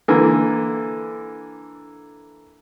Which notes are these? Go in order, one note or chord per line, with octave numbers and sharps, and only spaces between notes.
D3 E3 A#3